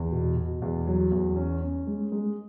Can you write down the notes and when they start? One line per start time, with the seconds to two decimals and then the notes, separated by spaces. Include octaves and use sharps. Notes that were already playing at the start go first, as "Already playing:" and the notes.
Already playing: E2
0.12 B2
0.37 B2
0.62 E2
0.87 F#3
1.12 E2
1.36 C#4
1.61 C#4
1.87 G#3
2.12 G#3